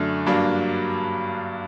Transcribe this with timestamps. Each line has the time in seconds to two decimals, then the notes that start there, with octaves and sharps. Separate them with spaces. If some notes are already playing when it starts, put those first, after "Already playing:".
Already playing: F#2 D3 A3 D4
0.26 G2 F#3 A#3 D4